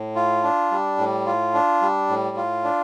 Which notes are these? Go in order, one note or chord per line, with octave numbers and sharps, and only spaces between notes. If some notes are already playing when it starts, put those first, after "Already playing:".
Already playing: A2
F4
D4
G3
A2
F4
D4
G3
A2
F4
D4